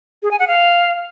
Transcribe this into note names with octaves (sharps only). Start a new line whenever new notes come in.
G#4
G#5
F#5
F5